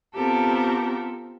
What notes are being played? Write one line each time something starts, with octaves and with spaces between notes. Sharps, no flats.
B3 C4 F4 G4 A4 A#4